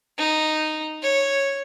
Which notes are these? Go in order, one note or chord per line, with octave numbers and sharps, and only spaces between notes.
D#4
C#5